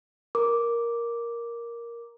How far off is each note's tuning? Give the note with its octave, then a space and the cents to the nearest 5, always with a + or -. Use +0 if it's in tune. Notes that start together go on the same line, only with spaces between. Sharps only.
A#4 +5 D6 -5